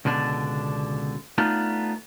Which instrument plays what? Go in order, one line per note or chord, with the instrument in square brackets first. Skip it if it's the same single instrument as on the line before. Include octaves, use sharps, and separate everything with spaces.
[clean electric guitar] C#2 B2 D3 D4
A3 B3 D4 D#4 F4